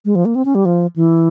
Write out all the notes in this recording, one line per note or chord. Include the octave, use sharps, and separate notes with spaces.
G#3
F3
A#3
C4
C#4
G3
F3
E3